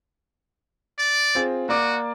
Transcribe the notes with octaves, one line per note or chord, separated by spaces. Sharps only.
D5
C4 F4 G#4
A#3 F#4 D5 D6